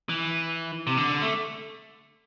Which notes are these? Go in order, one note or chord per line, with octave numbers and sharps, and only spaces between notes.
E3
C3
D3
A3